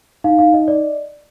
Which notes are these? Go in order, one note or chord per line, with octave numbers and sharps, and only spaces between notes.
D#4 F5
D#4 F5
D#4 D#5
D5